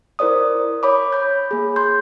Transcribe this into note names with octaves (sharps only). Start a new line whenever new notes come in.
E4 A#4 C5 D5 D#6
C#5 B5 D6
B5 G6
A#3 G#4
C6 G6